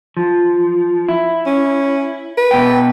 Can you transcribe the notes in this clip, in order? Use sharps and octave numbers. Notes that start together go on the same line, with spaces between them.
F3
E4
C#4
B4
B2 G5